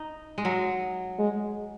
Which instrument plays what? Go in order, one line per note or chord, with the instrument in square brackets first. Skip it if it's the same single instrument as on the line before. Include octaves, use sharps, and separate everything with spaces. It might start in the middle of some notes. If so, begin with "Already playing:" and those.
Already playing: [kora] D#4
G#3
F#3
[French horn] G#3